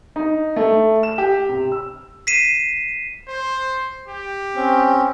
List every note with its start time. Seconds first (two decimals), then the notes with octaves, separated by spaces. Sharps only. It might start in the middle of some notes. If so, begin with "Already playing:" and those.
0.16 D#4
0.56 A3
1.03 E7
1.18 G4
1.49 C3
1.72 E6
2.27 B6 C7 D#7 E7
3.28 C5
4.08 G4
4.56 C4 C#4